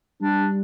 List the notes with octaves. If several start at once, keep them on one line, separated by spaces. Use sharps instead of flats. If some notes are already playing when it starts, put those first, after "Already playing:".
G3 D4